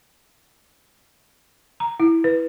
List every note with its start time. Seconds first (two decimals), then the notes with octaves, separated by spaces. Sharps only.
1.80 A#5
2.00 E4
2.24 B4